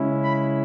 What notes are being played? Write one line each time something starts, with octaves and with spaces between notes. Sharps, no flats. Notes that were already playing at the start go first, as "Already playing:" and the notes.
Already playing: C#3 G#3 C#4 E4
B5